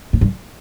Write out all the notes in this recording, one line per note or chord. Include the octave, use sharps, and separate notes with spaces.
A2
G2